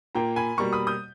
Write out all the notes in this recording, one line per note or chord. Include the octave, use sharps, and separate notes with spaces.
A#2 A#3 G5 A#5
G#5 B5
B2 G3 A#3 A#5 C#6
B5 D#6
D#6 G6